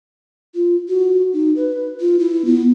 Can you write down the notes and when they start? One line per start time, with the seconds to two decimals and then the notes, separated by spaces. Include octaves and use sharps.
0.55 F4
0.89 F#4
1.33 D#4
1.56 B4
2.00 F4
2.19 E4
2.45 B3